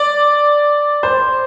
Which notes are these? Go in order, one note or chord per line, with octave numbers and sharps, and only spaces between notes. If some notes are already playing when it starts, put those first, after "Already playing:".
Already playing: D5
C5